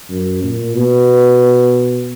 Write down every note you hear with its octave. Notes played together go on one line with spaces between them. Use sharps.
F#2
A#2
B2